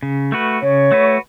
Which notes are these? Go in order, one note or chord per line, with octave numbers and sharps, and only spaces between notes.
C#3
A3 F#4 B4
C#3 C#5
A3 F#4 B4